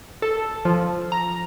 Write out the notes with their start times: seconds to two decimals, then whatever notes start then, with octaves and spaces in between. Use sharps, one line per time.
0.22 A4
0.65 F3
1.12 A#5